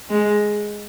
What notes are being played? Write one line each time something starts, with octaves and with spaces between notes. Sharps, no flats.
G#3